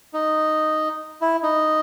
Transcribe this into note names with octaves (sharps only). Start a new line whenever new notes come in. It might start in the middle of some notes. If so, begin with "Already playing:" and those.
D#4
E4
D#4